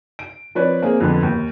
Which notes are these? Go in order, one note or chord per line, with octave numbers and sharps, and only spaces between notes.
D7
F3 C4 B4 C#5 D5
A#3 C4 G#4
F2 D3 B3
D#2